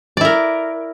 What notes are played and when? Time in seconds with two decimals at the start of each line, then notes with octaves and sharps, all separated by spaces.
0.17 D5
0.21 E4
0.25 A#4